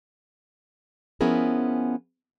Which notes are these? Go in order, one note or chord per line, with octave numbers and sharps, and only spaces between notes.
F3 B3 C#4 E4 G#4 A#4